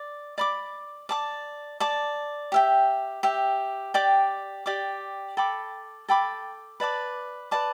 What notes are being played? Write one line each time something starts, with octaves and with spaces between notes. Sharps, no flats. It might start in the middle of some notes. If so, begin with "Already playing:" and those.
Already playing: D5 D6
D5 B5 D6
D5 A5 D6
D5 A5 D6
G4 E5 G5
G4 E5 G5
G4 D5 G5 D6
G4 D5 G5 D6
A4 G5 B5 D6
A4 G5 B5 D6
B4 D5 A5 D6
B4 D5 A5 D6